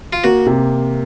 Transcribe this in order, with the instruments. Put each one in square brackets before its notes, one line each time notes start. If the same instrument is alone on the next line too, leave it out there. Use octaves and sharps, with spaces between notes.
[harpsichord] F4
[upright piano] A#3 [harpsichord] F#4
[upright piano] C3